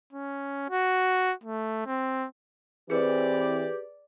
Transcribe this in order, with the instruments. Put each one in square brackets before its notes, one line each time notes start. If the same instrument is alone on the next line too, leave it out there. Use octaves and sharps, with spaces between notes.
[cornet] C#4
F#4
A3
C4
[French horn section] E3 C4 [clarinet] G4 [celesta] G#4 B4 [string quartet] D5